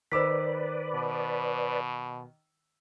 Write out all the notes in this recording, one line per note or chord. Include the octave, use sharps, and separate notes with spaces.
D#3 B4 C5 D5 D6 E6 B6
B2